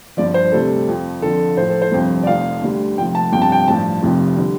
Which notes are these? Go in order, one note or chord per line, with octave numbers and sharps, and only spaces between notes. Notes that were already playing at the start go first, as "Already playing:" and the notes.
G1 G2 F3 D5
C5
D2 C3 G3 A4
F2 F3
F2 D3 F3 A4
A1 A2 F3 C5
A4
C5
G1 F2 C3 F3
D5
F1 F2 F3 F5
D2 D3 G3
F1 F2 F3 G5
A5
G1 F2 C3 G5
A5
G5
A1 G2 F3 A5
F1 F2 C3 F3
D3 G3